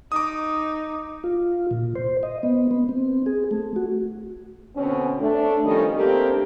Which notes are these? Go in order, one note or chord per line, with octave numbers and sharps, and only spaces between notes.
D#4 D6 D#6
F4
A#2
C5
D#5
B3
B3
C4
G#4
A3
F#4
B2 D3 C4 C#4
A3 D4
D#3 F3 G3 C#4 A4 D#5
A3 A#3 C4 D4 G4 A4